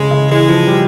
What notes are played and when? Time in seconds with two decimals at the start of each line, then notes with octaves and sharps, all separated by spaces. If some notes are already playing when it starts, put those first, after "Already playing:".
Already playing: C#3 G#3
0.11 C#3
0.29 E3 G#3
0.49 F3
0.67 G3